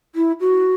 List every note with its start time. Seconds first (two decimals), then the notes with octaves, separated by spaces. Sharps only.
0.15 E4
0.40 F#4